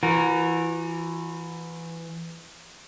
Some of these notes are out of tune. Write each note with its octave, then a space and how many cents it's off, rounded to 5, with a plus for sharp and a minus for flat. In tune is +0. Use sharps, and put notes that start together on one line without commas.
E3 +15 F#4 -35 A#4 +0